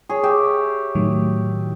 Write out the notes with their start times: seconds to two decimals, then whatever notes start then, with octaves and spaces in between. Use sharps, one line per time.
0.09 G#4 C#5
0.23 G4 E5
0.95 A2 D#3 F#3